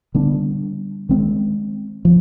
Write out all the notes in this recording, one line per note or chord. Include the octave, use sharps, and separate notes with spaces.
D3 G3 B3 D4
D#3 G#3 C4
F3